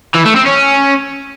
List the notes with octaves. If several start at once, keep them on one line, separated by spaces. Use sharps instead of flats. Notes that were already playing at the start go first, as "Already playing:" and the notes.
E3
A3
C4
C#4